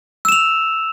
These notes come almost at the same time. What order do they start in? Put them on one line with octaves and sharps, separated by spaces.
E6 E7 F7